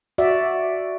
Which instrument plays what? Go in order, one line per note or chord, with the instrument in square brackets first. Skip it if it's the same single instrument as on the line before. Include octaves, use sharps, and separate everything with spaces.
[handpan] F#4 D5 E5